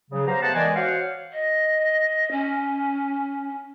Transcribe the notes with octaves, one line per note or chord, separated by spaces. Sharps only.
C#3 F#3
B3 G4 C5 F5 A#5
A3 B3 C5 F#5 A5
D#3 E3 G#3 D5 D#5 G#5
F#4 C5 C#5 F5 F#5
D#5
C#4